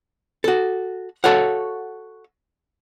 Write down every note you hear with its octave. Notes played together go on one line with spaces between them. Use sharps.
F#4 A4
F#4 A4 C#5 F5 F#5